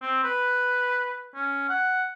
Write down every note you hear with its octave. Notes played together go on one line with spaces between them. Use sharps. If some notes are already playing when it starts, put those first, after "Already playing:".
C4
B4
C#4
F#5